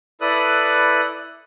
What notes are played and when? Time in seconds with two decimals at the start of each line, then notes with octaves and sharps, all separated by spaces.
0.21 E4 A4 B4 D5 D#6 F#6